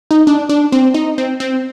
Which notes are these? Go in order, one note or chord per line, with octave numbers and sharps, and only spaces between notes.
D#4
D4
D4
C4
D#4
C4
C4